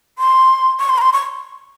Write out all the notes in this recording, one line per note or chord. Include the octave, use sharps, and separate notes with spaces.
C6
C#6
C6
A#5
C6
C#6